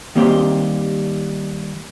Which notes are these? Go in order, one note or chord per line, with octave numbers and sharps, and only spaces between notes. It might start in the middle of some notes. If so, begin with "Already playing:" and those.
D#3 G3 A#3 C4 G4 C5